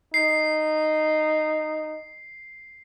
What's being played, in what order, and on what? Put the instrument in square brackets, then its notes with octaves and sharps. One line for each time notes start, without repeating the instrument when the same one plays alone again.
[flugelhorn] D#4 [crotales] C7